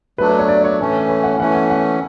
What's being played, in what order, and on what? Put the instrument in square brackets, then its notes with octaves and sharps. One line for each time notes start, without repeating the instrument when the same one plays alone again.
[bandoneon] F#3 A3 D4 [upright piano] B4
[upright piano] C#5
C#5
D5
C#5
[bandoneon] A2 E3 A3 C#4
[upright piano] B4
F#5
[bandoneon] E3 A3 C#4 [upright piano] F#5
[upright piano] G#5
F#5